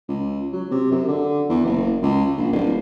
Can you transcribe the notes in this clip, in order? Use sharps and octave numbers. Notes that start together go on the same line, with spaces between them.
C#2
F#3
C3
F#2
D3
E2
F#1
C#2
A#1
D1